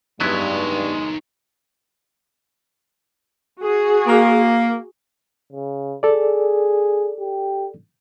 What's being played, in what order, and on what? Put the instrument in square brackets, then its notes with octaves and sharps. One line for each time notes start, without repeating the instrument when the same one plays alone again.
[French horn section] G2 [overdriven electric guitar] D#3 C#5 [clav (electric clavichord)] F#3 B3 E4 [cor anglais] G#3
[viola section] F#4 G#4
[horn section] A#3
[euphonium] C#3
[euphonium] G#4 [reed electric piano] A4 D5
[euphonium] G4